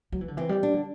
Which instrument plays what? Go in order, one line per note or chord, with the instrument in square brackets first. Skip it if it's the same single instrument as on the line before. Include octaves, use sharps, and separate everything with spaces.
[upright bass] F#3
E3
D3
[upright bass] E3 [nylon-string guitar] C4
[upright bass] G3
[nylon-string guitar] D4
[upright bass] D3